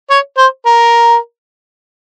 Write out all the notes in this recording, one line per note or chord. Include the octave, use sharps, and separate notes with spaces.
C#5
C5
A#4